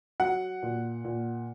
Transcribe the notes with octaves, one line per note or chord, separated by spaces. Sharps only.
F#3 F#5
A#2
A#2